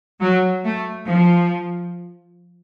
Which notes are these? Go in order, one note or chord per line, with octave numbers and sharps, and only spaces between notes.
F#3
A3
F3